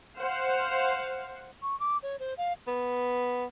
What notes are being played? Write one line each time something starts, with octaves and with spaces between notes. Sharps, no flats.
C5 F5 F#5
C#6
D6
C#5
C5
F5
B3